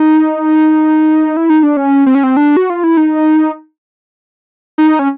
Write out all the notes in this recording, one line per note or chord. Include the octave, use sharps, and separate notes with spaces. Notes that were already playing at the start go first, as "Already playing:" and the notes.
Already playing: D#4
E4
D#4
D4
C#4
C4
C#4
C4
D4
F#4
F4
E4
D#4
D#4
C#4